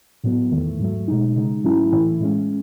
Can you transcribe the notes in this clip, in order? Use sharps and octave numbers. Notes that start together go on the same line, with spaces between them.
A2 F#3 B3
E2 D#3 A3
G#2 F#3 A3
B2 G#3 D#4
C#3 G#3 D#4
G#2 F#3 A3 C#4 E4
A2 E3 A3 E4
A2 G#3 C#4